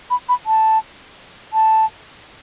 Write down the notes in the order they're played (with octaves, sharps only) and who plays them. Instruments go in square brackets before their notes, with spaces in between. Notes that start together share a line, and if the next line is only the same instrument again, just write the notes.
[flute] B5
B5
A5
A5